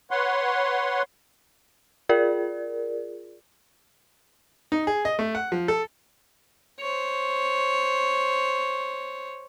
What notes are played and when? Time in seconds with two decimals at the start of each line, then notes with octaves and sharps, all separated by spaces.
0.11 B4 C#5 F#5 C6
2.09 F4 G#4 A#4 D5
4.72 D#4
4.87 G#4
5.05 D#5
5.19 A3
5.35 F#5
5.52 F3
5.68 A4
6.80 C5 C#5